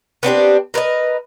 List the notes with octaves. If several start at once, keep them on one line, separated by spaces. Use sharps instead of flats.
B3 C4 D4 G4
A#4 B4 D5 D#5